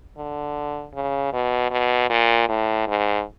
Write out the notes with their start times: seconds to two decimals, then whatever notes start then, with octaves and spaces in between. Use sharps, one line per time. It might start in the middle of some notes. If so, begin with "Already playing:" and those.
0.18 D3
0.94 C#3
1.33 B2
1.71 B2
2.10 A#2
2.49 A2
2.88 G#2